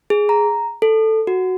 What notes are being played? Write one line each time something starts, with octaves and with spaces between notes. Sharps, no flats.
G#4
A#5
A4
F#4